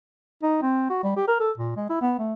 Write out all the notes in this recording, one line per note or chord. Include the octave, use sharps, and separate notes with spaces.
D#4
C4
F#4
G3
G4
A#4
A4
A#2
G#3
E4
B3
A3